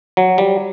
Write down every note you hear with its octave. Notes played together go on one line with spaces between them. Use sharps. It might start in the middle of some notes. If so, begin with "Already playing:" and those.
F#3
G3